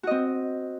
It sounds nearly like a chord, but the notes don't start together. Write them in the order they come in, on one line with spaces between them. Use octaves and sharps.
F#4 D#5 C4